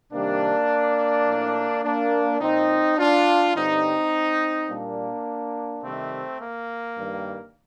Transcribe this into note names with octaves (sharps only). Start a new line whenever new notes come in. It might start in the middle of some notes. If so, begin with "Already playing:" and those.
C3 D#3 G3 A#3 D4
A2 F3
A#3 D4
A#2 F3 C4 D#4
D4 F4
G2 D3 G3 C4 D#4
A#2 G3 A#3 D4
C3 D#3 G3 A3 C4
A#3
G2 D#3 G3